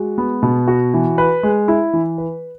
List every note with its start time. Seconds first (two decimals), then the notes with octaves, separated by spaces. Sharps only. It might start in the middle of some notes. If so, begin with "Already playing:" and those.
Already playing: G#3 F#4
0.18 B3
0.43 B2
0.68 F#4
0.94 E3
1.18 B4
1.43 G#3
1.68 E4
1.93 E3
2.18 B4